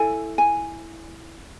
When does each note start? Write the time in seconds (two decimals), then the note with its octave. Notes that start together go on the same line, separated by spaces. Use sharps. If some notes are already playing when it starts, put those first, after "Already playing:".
Already playing: E4 A4 G#5
0.38 G#5